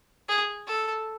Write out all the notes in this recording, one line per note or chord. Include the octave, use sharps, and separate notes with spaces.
G#4
A4